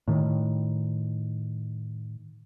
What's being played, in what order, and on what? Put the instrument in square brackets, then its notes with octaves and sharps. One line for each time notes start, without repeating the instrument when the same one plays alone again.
[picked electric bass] A2 D#3